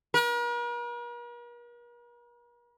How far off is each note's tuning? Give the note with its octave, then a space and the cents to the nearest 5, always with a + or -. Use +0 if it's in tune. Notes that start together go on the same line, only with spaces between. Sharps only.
A#4 +45